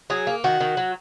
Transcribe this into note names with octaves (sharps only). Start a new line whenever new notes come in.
F#3 G#4
A#3
D#3 F#4
D#3
F#3